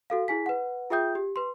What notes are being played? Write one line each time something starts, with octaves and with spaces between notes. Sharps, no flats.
F#4 A4 F5
E4 G#4 G#5 B6
B4 F#5
F4 G#4 E5 G5 D#6 G6
G4
B4 C6